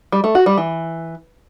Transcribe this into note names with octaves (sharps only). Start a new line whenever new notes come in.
G3
A3
F#4
G3
E3